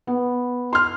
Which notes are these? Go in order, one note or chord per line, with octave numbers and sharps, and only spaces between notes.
B3
C6 F6